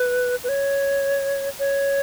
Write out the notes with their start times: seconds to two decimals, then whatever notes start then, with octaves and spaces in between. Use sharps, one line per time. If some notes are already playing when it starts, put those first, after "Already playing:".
Already playing: B4
0.44 B4
0.49 C#5
1.59 C#5